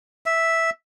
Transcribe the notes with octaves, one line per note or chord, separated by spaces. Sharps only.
E5